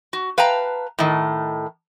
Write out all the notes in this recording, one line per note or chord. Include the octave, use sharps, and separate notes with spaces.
F#4
B4 F5 G5 A5 A#5
A2 D#3